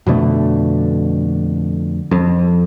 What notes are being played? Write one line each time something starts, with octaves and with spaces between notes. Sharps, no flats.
F2 B2 D3 A3
F2